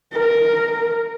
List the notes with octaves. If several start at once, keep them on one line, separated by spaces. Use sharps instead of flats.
A#4